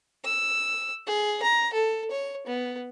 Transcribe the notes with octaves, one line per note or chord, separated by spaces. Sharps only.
E6
G#4
A#5
A4
C#5
B3